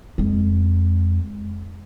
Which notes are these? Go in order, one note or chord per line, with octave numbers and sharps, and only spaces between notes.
F2 G#3